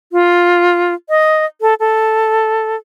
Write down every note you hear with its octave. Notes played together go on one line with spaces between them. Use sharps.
F4
D#5
A4
A4